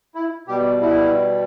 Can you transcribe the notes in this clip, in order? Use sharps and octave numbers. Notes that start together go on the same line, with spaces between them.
E4
B2 G3 G4
E4